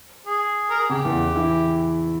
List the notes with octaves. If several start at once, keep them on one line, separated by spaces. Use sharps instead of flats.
G#4
A#4
G#4
C#3 G4
E2 E3
E3 E4